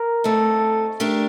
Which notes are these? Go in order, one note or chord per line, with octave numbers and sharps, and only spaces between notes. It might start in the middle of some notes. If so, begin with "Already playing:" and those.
Already playing: A#4
A3 C4 D#4 A4
A3 D4 G4 A#4